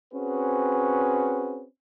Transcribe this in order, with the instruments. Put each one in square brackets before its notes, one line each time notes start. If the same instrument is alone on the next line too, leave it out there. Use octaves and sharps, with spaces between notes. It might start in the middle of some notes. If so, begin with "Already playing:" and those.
[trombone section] C4 C#4 F#4 G#4 B4